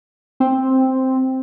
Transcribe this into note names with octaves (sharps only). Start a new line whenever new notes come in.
C4